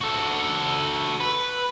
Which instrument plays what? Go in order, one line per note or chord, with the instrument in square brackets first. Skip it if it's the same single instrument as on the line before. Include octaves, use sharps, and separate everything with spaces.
[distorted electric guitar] F#4 A4
B4